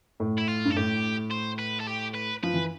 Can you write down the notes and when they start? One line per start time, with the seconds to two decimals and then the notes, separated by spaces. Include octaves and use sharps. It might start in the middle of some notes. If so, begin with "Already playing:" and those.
0.20 A2
0.38 E4
0.48 F4
0.65 G2
0.71 A4
0.76 A2 G4
1.31 C5
1.59 B4
1.80 A4
1.87 G4
2.15 B4
2.43 F3 B4
2.54 E3